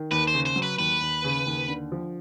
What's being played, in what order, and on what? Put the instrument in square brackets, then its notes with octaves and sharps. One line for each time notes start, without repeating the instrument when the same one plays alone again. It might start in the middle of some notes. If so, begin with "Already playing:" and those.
Already playing: [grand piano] D#3
[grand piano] D#2 [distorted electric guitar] B4
[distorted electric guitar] C5
[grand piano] C#3
[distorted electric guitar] C5
[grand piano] F#3
[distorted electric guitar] B4
[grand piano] D#2 [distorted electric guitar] B4
[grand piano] D#2
C#3
D#2
D3
F3